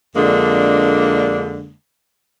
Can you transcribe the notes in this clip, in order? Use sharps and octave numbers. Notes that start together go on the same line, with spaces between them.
F2 D3 G#3 A#3 D4